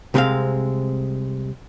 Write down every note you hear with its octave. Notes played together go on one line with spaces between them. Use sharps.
C2 C3 G3 G#3 C4 F5